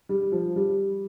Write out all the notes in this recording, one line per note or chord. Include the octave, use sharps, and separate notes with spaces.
G3
F3
G3